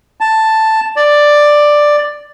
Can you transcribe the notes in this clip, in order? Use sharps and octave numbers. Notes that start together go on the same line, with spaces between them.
A5
D5